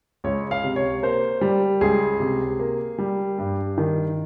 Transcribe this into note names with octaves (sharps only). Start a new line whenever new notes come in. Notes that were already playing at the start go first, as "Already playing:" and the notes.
C#2 C#5
F5
C3
C#5
A#3 C5
G3
C#2 G#4
C3
A#3
G3
G2
D#3